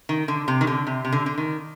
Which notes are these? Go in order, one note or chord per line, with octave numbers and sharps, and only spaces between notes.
D#3
D3
C3
D#3
D3
C3
C3
D3
D3
D#3